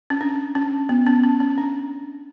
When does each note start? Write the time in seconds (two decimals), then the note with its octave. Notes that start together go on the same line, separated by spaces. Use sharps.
0.10 C#4
0.21 D4
0.55 C#4
0.89 B3
1.06 C#4
1.24 C#4
1.40 C#4
1.58 D4